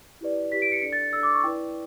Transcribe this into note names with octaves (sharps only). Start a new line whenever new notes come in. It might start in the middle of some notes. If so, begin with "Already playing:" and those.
E4 G4 B4 D5
E4 G4 B4 D5 B6
D7
C#7
D4 A4 D5 C#7
A6
D4 A4 D5 E6
D6
C#6
E4 B4 D5 G5